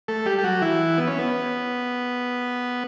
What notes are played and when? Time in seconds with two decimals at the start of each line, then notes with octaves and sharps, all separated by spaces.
0.08 A3 A4
0.26 G3 G4
0.38 G4
0.44 F#3 F#4
0.62 E3 E4
0.98 B3
1.08 C#4
1.19 B3